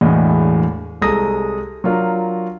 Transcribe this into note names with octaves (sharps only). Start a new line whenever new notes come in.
E1 E2 A2 D4 D#5
C2 G#3 A4 A#5 D#6 A#6
F#3 D4 F4 A#4